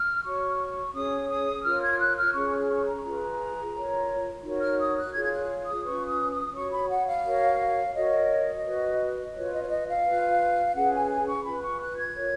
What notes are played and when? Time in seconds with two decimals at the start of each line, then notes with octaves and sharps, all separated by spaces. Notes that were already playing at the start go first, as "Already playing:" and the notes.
Already playing: F6
0.23 F#4 C#5 C#6
0.94 C#4 G#4 C#5 D#6
1.30 D#6
1.64 F4 A#4 C#5 F6
1.81 G#6
1.99 F#6
2.16 F6
2.34 C#4 G#4 C#5 C#6
2.69 C#6
2.87 A#5
3.05 F4 G#4 B4
3.75 F4 A#4 C#5
4.44 D#4 F#4 A#4 C#5
4.62 F6
4.79 D#6
4.97 F#6
5.14 F4 G#4 C#5 G#6
5.25 G#6
5.32 F#6
5.67 D#6
5.84 C#4 F4 B4 C#6
6.08 D#6
6.32 D#6
6.55 F#4 C#5 C#6
6.72 B5
6.90 F#5
7.07 F5
7.24 F#4 A#4 C#5
7.95 F#4 A#4 C#5 D#5
8.65 F#4 B4
9.35 F4 B4 C#5
9.53 D#5
9.62 C#5
9.70 D#5
9.87 F5
10.05 F4 B4
10.75 C#4 G#4 B4 F#5
10.93 G#5
11.11 G#5
11.28 C#6
11.45 F4 B4 B5
11.63 C#6
11.81 F#6
11.97 G#6
12.15 F4 A#4 C#5